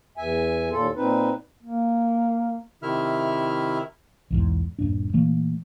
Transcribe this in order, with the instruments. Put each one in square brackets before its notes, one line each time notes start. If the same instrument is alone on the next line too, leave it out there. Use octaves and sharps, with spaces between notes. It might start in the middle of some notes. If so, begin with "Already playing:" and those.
[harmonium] E2 E5 G#5
D#2 A#2 F4 A4
A#2 C4 D#4 B4
[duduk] A#3
[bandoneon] C3 D#3 E4 E5 F6
[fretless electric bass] B1 E2 G#2
D#1 G2 D4
A#2 E3 A3 A#3